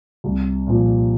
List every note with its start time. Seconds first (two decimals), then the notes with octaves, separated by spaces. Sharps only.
0.24 C2
0.67 A#2 F3